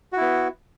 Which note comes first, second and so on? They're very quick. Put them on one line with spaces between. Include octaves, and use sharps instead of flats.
F#4 E4 B3